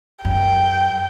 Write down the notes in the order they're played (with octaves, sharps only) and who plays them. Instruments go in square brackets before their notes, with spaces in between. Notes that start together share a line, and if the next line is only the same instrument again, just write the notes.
[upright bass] F#2 [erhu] G5